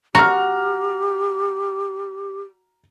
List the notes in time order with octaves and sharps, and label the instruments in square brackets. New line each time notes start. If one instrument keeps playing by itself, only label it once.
[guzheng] F#4 [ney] G4 [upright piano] A#5 F6